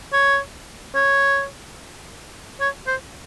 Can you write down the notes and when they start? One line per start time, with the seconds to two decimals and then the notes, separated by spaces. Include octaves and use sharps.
0.13 C#5
0.95 C#5
2.60 C#5
2.87 C5